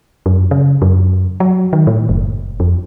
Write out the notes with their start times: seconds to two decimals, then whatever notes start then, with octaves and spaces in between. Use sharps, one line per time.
0.26 F#2
0.51 C#3
0.82 F#2
1.40 F#3
1.73 D#3
1.87 A2
2.09 F#1
2.60 F2